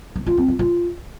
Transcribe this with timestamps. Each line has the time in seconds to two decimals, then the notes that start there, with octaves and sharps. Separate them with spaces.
0.16 D#4
0.26 F4
0.37 C4
0.48 F4
0.59 F4